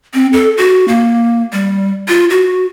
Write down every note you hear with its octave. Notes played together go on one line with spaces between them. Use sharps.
C4
A4
F#4
A#3
G3
F4
F#4